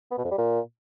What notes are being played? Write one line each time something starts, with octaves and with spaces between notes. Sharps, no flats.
B3
B2
F2
G3
A#2